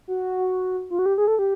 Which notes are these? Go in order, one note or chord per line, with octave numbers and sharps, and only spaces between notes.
F#4
F4
F#4
G4
G#4
A4
G4